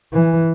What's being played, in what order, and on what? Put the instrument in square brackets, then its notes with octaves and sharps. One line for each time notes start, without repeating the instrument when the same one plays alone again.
[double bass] E3